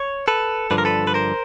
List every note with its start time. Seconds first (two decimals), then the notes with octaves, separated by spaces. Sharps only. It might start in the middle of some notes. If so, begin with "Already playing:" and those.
Already playing: C#5
0.28 A4 B4
0.71 G2 D3 F3 B4
0.78 A#4
0.85 A4 B4
1.07 B4
1.14 A#4 C5